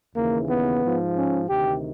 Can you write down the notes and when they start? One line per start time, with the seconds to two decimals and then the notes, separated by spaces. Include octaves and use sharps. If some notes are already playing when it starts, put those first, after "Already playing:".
0.16 D#2 C#3 E3 A#3
0.49 B3
0.83 G#2 F3
1.16 C#4
1.48 D2 C3 D#3 G4